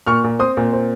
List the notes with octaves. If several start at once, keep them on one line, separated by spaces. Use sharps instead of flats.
A#2 C#6 F6
A#2
C4 C6 D#6
A#2
C4